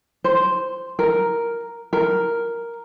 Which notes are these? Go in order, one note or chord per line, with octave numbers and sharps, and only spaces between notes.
C5
A#4
A#4